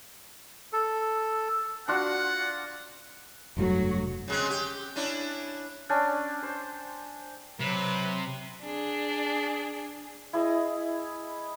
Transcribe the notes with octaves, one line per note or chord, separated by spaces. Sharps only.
A4
D4 F4 F#4 F#5
F1 G2 F#3 A3 F#4
C#3 G#3 C4
G4
C#4 D4 E4
C#4 D4 G5 G#5
C5
C3 F#3 B4
D4 G#4
E4 G#4 D#5